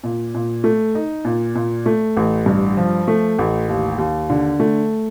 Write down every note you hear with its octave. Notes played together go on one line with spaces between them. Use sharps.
A#2
A#2
A3
D#4
A#2
A#2
A3
A1
G2
F3
A3
A1
D#2
D#2
D3
A3